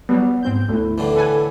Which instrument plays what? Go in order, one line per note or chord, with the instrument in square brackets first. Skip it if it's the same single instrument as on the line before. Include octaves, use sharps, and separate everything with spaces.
[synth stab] F#3 G3 [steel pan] B3
[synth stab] G#2 C4 G6
[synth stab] D2 [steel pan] A3 E4
[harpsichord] A2 D3 E3
[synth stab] A4 B4 G#5